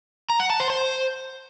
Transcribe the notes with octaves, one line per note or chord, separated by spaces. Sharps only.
A#5
F#5
A5
C5
C5